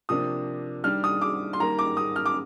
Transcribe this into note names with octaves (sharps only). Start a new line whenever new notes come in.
C3 F3 A#3 D4 D#6
D#3 G3 D4 F6
D#6
D6
C6
D#3 G3 A#3 A#5
D6
D#6
F6
D6